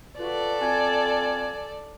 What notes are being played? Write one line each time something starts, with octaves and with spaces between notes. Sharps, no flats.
F4 F#4 A4 B4 D5
C4 F4 G#5